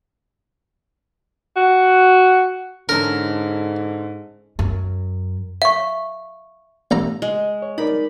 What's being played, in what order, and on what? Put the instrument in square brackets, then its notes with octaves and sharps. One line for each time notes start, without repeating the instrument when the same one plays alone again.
[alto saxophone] F#4
[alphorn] G#2 [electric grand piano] D3 C#4 A4 [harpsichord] A#4
[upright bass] F#2
[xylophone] E5 [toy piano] F5 C#6
[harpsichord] A1 A3 A#5
[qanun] G#3
[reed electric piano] C#5
[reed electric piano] D#4 A#4 D5 [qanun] B5